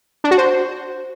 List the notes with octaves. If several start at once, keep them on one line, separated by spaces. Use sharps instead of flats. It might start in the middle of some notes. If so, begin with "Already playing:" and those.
D4
F#4
C5